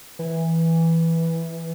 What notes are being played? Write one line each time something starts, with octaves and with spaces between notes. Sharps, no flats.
E3